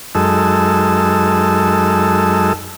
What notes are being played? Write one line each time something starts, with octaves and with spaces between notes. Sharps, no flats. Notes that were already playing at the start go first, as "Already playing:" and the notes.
F#2 G#3 D#4 A4 E6